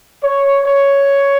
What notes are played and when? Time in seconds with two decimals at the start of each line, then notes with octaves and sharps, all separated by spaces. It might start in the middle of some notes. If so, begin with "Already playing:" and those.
0.23 C#5
0.66 C#5